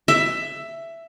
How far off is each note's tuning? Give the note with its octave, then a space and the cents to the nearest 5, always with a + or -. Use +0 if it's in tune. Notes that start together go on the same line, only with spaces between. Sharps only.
E5 +10